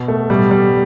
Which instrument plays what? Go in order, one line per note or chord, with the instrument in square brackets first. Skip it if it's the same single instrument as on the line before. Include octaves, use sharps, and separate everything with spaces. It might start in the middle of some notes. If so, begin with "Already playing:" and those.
Already playing: [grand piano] B2
A3
B2 G3
G3